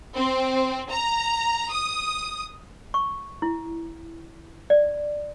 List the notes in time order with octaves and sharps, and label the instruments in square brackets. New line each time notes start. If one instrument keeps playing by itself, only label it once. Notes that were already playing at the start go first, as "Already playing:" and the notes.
[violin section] C4
A#5
D#6
[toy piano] C#6
E4
D5